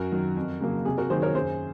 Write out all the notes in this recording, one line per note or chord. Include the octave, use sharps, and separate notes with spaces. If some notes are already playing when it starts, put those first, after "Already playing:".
Already playing: F#2 F#4 A#4
D#3 F#3
F2
C#3 F#3 A#3
C3 G#4
F#4 A#4
D#3 F#3 A#3 G#4 C5
A#4 C#5
F#2 G#4 C5